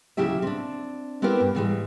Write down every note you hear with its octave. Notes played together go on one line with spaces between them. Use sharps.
D2 C#3 F#3 E4 G4 E5
C4 D4
B3 C4 E4 G4 A#4 B4
G2
G#2 D3 E3 G3 G#3